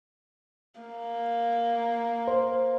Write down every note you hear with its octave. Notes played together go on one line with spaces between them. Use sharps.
A#3
C5